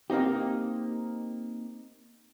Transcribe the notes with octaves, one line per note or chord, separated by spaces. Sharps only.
A#3 C4 D#4 G4